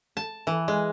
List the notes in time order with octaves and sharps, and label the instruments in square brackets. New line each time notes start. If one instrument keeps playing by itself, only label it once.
[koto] A5
E3
G#3